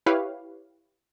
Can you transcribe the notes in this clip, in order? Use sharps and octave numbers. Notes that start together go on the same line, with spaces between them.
E4 G4 B4 C#5 F5